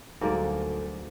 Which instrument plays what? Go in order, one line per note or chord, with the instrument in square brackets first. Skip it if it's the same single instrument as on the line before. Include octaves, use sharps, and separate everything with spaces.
[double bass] D2 [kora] G#2 A#3 D5 [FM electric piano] F#3 G3 F#4 [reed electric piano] A4